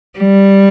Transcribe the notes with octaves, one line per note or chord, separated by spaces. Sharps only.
G3